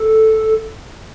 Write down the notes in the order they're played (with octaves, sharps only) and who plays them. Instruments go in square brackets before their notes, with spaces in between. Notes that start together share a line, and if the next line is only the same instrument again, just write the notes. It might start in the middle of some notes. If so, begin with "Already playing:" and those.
Already playing: [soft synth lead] A4